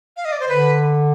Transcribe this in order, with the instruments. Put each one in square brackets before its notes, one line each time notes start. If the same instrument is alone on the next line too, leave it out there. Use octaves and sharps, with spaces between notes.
[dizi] F5
D#5
D5
C5
[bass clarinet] D3 [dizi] B4